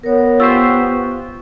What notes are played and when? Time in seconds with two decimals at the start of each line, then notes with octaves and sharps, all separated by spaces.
0.03 B3 A#4 C#5
0.40 F4 G4 C5 C#6 E6